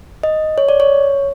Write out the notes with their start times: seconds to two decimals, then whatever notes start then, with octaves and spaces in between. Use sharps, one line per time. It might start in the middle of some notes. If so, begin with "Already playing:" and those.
0.23 D#5
0.58 C#5
0.69 D5
0.80 C#5